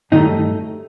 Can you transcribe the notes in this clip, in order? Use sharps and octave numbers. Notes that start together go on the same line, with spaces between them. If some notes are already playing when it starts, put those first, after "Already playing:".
G2 D#3 F#3 A3 D#4